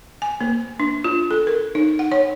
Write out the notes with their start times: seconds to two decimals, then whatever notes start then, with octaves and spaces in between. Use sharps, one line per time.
0.22 G#5
0.41 A#3
0.80 D4
1.04 F4
1.31 A4
1.47 A#4
1.75 D#4
1.99 F#5
2.12 C#5